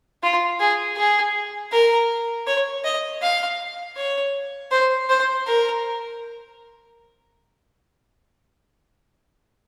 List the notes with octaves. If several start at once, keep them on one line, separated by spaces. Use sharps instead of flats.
F4
G#4
G#4
A#4
C#5
D#5
F5
C#5
C5
C5
A#4